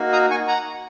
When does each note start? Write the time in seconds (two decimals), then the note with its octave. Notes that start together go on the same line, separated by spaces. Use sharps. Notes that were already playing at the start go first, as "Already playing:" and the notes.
Already playing: A#3 D#4 F#4
0.13 A#5 D#6
0.31 G#5 C#6
0.48 F#5 A#5